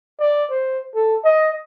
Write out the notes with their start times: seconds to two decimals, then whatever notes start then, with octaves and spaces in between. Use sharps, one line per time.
0.20 D5
0.51 C5
0.95 A4
1.25 D#5